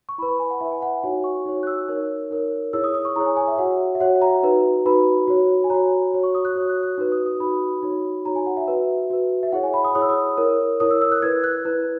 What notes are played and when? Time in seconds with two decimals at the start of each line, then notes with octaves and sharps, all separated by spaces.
0.09 C#6
0.18 E4 B5
0.22 B4
0.29 B5
0.39 G#5
0.50 F#5
0.61 E4 B4 E5
0.72 G#5
0.82 F#5
1.03 D#4 F#4 C#5 G#5
1.24 C#6
1.46 D#4 F#4 C#5
1.63 F#6
1.67 E6
1.89 D#4 A#4 C#5
2.30 D#4 A#4 C#5
2.73 E4 G#4 C#5 E6
2.84 D#6
2.94 D#6
3.05 C#6
3.16 E4 G#4 C#5 A#5
3.26 G#5
3.37 G#5
3.48 E5
3.58 F#4 C#5 F#5
3.95 E5
4.00 F#4 C#5 F#5
4.22 A#5
4.43 D#4 F#4 B4
4.86 D#4 F#4 B4 B5
5.28 F#4 C#5
5.64 G#5
5.70 F#4 C#5 A#5
6.14 F#4 C#5
6.23 C#6
6.35 D#6
6.45 F#6
6.55 F#4 C#5
6.69 F#6
6.83 F#6
6.98 D#4 F#4 B4
7.12 D#6
7.26 D#6
7.40 D#4 F#4 B4 B5
7.83 D#4 F#4 C#5
8.25 D#4 F#4 C#5 A#5
8.36 G#5
8.46 F#5
8.57 E5
8.68 F#4 B4 E5
9.10 F#4 B4
9.43 E5
9.53 E4 G#4 C#5 F#5
9.63 G#5
9.74 B5
9.84 D#6
9.95 E4 G#4 C#5 D#6
10.02 E6
10.09 D#6
10.37 E4 A#4 C#5
10.80 E4 A#4 C#5 D#6
10.91 E6
11.02 E6
11.12 F#6
11.22 E4 B4 G#6
11.44 F#6
11.65 E4 B4